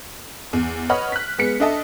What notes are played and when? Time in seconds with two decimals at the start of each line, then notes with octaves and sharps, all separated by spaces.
0.53 E2
0.89 B4 C#5 D#5 F#5 B5 F6
1.12 F#6 B6
1.38 G#3 B3 B6 C#7
1.60 D4 A4 D#5 E5 A5